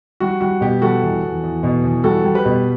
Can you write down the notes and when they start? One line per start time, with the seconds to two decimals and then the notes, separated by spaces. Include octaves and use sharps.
0.20 G3 F#4
0.41 G3 F#4
0.61 B2 G4
0.82 G3 F#4 A4
1.02 E2
1.23 E2
1.44 E2
1.63 B2
1.84 E2
2.04 G3 F#4 A4
2.24 G3
2.34 G4 B4
2.45 B2